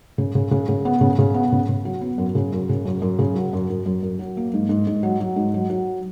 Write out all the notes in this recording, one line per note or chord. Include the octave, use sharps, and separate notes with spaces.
C#3
C#3
C#3
C#3
B3
C#3
C#3
B3
C#3
C#3
F#3
B3
F#2
C#3
F#2
C#3
F#2
F#2
C#3
F#3
F#2
F#2
F#2
F#2
F#3
A#3
G#2
G#2
G#2
F#3
F#3
G#2
F#3
F#3